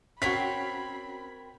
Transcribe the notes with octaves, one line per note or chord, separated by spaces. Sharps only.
C4 C#4 F#4 A#4 C#5 B5 B6